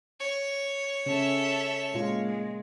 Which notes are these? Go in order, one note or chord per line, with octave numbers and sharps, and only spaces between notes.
C#5
C#3 C#4 A4 E5
A#2 G#3 F4